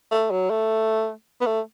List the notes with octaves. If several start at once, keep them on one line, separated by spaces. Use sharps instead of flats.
A3
F#3
A3
B3
A3